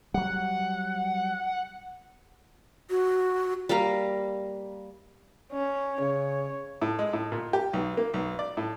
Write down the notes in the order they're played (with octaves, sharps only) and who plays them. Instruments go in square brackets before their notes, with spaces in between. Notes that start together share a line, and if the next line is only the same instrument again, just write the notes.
[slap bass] F#3 G3 [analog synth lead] F#5
[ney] F#4
[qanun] G3 A#3 F5 A#5
[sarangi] C#4
[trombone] C#3 [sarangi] C#5
[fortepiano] A2
G#3
A2
A#2
G4
B1
A#3
B1
D5
A2